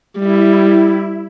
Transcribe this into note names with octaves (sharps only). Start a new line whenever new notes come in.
G3 E4